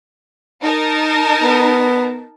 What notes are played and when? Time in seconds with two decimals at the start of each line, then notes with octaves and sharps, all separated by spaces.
0.63 D#4 A#4 A5
1.43 B3